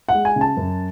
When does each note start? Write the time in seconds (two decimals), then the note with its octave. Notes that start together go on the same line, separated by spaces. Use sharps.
0.09 F#5
0.14 G#3
0.25 G#5
0.36 C#3
0.41 A5
0.57 F#2